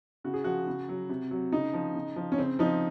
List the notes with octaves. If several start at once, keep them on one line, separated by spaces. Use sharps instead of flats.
C#3 F#4
G#4
F3 F#4
C#3
F#3
C3
F#3
C#3 D#4
F3
C#3
F3
C#4
C#3 C4
F3 D#4